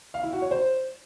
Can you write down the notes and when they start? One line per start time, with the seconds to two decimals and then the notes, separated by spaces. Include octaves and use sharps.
0.14 F5
0.23 E4
0.33 F#4
0.42 C#5
0.51 C5